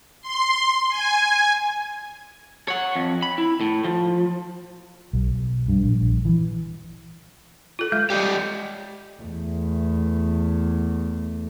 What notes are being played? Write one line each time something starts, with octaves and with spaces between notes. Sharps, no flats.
C6
G#5
C#5 F#5
F2
B5
E4
A2
F3
B1
G2
A#1
E3
F4 A4
G#3 E5 G6
G4 D5 D#5
E2 A3